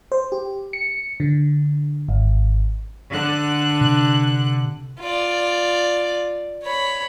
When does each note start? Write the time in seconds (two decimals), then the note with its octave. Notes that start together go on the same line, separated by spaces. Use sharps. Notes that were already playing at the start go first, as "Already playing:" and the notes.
0.12 C5
0.32 G4
0.73 C#7
1.20 D3
2.08 G#1
3.10 D3 F#6
3.81 C3
4.99 F4 D5
6.64 C#5 B5